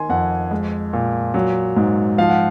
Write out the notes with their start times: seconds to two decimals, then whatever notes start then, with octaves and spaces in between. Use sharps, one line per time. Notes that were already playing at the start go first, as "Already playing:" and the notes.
Already playing: D#3 G#5 C6
0.09 F2 F#5
0.51 G#3
0.93 A#2
1.34 F#3
1.76 G#2
2.18 F3 F5
2.30 F#5